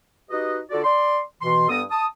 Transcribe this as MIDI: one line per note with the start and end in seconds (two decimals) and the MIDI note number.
0.30 0.58 63
0.30 0.58 66
0.30 0.58 67
0.30 0.58 71
0.30 0.58 75
0.71 0.82 50
0.71 0.82 65
0.71 0.82 66
0.71 0.82 69
0.71 0.82 74
0.84 1.20 74
0.84 1.20 84
1.42 1.67 47
1.42 1.67 52
1.42 1.67 84
1.68 1.82 43
1.68 1.82 59
1.68 1.82 69
1.68 1.82 87
1.91 2.05 81
1.91 2.05 87